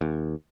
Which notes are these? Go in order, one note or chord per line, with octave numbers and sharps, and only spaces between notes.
D#2